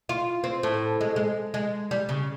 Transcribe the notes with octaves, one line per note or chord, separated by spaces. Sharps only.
F4
C4
A2
G#3
G#3
G#3
G3
C#3